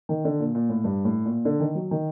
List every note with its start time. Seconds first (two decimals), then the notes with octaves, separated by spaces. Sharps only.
0.09 D#3
0.25 D3
0.39 A#2
0.55 A#2
0.69 A2
0.84 G2
1.05 A2
1.25 A#2
1.45 D3
1.60 D#3
1.75 F#3
1.91 D#3